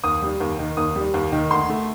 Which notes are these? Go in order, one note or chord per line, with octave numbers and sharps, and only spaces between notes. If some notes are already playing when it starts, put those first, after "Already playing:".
D#2 D#6
G3
D#2
D#3
D#2 D#6
G3
D#2
D#3
D2 C6
A3